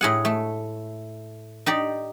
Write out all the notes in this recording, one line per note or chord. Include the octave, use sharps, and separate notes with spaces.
A2 G#4 F#5
A3
D#4 G4 D5